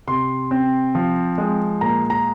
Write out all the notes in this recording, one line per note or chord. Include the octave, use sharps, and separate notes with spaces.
C3 C6
C4
F3
G#3
A#2 A#5
A#5